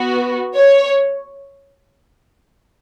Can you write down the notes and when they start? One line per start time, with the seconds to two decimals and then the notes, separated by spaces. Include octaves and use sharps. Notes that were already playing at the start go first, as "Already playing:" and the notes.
Already playing: B3 F#4
0.54 C#5